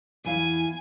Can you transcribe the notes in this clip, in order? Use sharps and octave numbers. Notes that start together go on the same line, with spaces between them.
E2 E4 F5 G#5